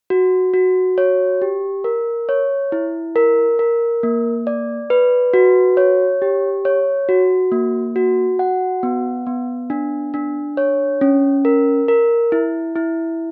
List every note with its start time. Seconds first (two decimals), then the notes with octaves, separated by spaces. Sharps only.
0.10 F#4
0.54 F#4
0.98 C#5
1.42 G4
1.84 A#4
2.29 C#5
2.72 E4
3.16 A#4
3.59 A#4
4.03 A#3
4.47 D5
4.90 B4
5.34 F#4
5.77 C#5
6.22 G4
6.65 C#5
7.09 F#4
7.52 A#3
7.96 F#4
8.39 F#5
8.83 B3
9.26 B3
9.70 D4
10.14 D4
10.57 C#5
11.01 C#4
11.45 A#4
11.88 A#4
12.32 E4
12.76 E4